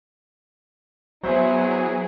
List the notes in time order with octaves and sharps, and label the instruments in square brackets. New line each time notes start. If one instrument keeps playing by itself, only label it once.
[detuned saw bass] F#3 [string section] B3 E4 G#4 [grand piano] C5 E5